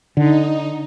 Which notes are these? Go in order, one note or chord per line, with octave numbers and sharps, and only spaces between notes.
D3 D#4